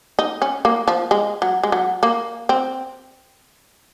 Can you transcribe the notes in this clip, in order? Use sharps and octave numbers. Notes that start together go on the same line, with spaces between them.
D#4
C#4
A#3
F3
G#3
F#3
G#3
F#3
A#3
C4